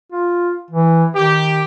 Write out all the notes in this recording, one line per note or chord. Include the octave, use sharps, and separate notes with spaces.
F4
E3
D#3 G4